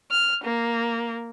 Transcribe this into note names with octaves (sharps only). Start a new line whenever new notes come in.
F6
A#3